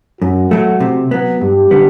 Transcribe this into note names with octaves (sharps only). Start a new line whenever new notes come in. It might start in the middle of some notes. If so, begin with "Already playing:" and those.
F#2 F#4
F#3 A3
C3
F#3 B3
G2 G4
D3 G3 B3